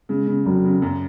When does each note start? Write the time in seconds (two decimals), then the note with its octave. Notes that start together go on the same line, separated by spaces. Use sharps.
0.09 C#3 G#3
0.27 C#3
0.45 F1 F#3
0.64 C#3
0.82 F#2